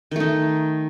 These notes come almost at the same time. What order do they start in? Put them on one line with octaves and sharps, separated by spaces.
D#3 A3 D#4